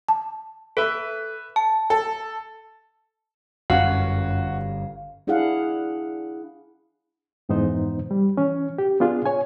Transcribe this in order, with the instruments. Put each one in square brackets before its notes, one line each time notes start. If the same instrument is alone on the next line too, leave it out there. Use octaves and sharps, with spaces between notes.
[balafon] A5
[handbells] A4 [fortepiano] B4 E5
[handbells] A5
[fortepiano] A4
[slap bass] G1 C#4 [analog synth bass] F#2 [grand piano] F#4 [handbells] F5
[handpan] D4 E4 G#4 F5 F#5
[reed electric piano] F2 G#2 E3 B3 D#4 C5
G3
E3 C#4
G4
B3 D4 F4 G#4
C#5 G#5